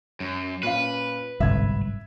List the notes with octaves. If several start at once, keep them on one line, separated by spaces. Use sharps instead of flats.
F#2
A#2 C#4 B4 F5
G1 C2 G#2 F#3 E5 G#6